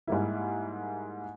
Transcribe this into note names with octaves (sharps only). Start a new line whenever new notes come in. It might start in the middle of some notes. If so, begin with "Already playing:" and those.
G#2 G3 A#3 E4